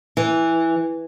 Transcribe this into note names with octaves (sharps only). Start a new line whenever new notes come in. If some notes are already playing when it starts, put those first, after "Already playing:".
E3